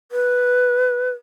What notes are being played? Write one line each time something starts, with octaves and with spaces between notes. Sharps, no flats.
B4